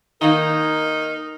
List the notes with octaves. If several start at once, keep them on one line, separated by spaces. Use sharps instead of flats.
D#3 A#3 D#4 A#4